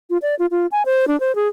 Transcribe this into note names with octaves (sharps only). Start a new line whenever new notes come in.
F4
D5
F4
F4
G#5
C5
D4
C5
G#4